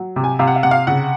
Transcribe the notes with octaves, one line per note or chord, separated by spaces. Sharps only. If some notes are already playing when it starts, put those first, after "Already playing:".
Already playing: F#3
C3
G#5
C3 F5
F#5
F5
C3 F#5
F5
C#3 F#5